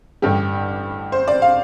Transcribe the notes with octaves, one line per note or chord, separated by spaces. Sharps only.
A1 G2 D3 G3 G4
C5
D5
F5